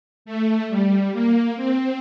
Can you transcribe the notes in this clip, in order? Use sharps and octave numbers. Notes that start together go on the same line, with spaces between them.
A3
G3
A#3
C4